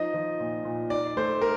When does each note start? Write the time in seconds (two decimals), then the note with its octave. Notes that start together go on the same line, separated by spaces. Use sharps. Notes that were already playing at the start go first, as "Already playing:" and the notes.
Already playing: F3 D#4 D#5
0.14 F3
0.40 A#2
0.65 A#2
0.90 D#4 D5
1.17 A3 C5
1.41 A#4